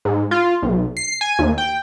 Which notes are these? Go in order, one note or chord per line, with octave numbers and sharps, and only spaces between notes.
G#2
F4
B1
C7
G#5
D#2
G5